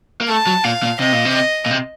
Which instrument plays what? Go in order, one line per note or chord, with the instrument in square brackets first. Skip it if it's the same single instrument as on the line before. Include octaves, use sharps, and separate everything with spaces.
[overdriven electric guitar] A#3
[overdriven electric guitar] A3 [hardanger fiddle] A5
[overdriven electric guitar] F#3
[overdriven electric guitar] A#2 [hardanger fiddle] F5
[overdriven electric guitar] A#2
[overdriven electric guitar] C3 [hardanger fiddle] D#5
[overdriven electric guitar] A#2
C3
[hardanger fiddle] D#5
[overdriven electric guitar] A#2
C3